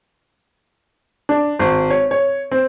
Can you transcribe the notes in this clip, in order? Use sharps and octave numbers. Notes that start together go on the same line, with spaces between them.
D4
G#1
C#5
C#5
C4